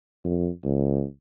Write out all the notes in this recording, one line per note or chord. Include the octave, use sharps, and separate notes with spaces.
F2
C#2